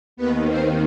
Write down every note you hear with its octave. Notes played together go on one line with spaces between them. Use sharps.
D#2 D#3 B3 B4
C4 C5